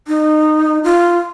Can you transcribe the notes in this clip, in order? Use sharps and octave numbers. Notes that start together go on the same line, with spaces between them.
D#4
F4